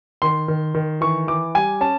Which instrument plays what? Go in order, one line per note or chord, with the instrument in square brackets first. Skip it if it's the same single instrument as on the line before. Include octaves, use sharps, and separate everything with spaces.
[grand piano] D#3 C6
D#3
D#3
E3 C#6
E3 D6
G3 G#5
C#4 A5